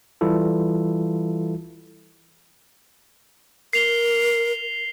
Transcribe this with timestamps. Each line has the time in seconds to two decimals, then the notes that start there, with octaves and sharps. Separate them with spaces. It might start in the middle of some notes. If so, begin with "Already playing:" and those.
0.21 E3 G3 E4 F4 A4
3.73 A#4 C7 F7 G7